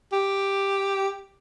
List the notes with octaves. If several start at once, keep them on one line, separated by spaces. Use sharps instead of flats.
G4